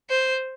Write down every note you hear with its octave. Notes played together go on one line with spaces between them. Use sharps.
C5